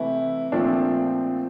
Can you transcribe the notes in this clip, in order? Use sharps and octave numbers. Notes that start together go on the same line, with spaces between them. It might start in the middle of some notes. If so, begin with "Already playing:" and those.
Already playing: C3 E3 A3 E4
A#2 F3 A3 C4 D4